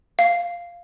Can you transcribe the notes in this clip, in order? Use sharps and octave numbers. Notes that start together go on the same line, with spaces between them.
F5